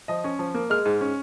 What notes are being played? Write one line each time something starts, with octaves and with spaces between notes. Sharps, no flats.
F3 D#5
C#4
F3
A#3
G#3 F6
G#2
C#4